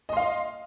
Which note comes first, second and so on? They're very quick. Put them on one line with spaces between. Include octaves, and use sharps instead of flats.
D#5 C6 F5